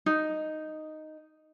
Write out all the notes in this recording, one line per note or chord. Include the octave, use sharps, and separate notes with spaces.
D#4